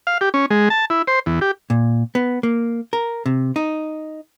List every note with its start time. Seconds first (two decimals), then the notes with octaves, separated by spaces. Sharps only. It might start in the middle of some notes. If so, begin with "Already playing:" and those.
0.07 F5
0.21 G4
0.34 C#4
0.50 G#3
0.70 A5
0.90 E4
1.07 C5
1.26 E2
1.41 G4
1.70 A#2
2.15 B3
2.43 A#3
2.93 A#4
3.26 C3
3.56 D#4